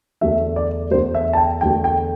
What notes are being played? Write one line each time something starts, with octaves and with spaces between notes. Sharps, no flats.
E2 D3 A3 E5
D5
E2 D3 A3 C5
E5
A5
G5
E2 D3 A3 G5
G5